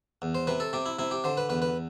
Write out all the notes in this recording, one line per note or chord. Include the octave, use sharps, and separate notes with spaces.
E2
C5
C3 B4
A4
C3 G4
E4
C3 E4
G4
D3 C5
B4
E2 B4
B4